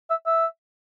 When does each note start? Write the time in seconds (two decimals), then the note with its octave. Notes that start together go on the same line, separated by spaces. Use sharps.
0.10 E5
0.26 E5